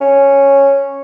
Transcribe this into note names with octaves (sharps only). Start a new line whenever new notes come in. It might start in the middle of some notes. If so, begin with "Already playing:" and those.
C#4